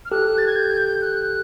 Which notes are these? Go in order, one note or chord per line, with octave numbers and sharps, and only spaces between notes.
F6
G4 A4 F#6
A6
G#6
G6
F#6